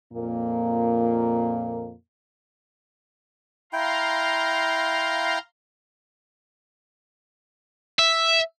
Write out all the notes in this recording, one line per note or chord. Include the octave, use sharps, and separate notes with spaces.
F2 A#2 A#3
E4 F5 G5 A#5 C6
E5